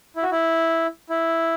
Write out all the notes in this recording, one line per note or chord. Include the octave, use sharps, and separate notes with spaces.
E4
F#4
E4
E4